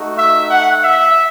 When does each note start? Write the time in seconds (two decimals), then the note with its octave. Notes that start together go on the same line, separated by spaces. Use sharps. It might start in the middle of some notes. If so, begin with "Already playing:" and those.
Already playing: A3 D#4 F#4
0.18 E5
0.50 F#5
0.82 E5